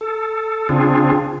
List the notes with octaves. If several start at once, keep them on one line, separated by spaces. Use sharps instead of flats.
A4
C#3 C4 D4 F4 G#4